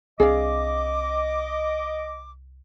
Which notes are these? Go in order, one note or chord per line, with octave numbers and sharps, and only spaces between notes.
C2 C4 D4 G#4 D5 D#5 F5 D6